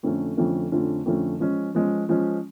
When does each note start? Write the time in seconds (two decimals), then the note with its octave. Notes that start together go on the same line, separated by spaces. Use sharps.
0.03 F2 D3 F3 A3 C#4
0.37 F2 D3 F3 A3 C#4
0.72 F2 D3 F3 A3 C#4
1.06 F2 D3 F3 A3 C#4
1.40 F3 G#3 C#4
1.75 F3 G#3 C#4
2.09 F3 G#3 C#4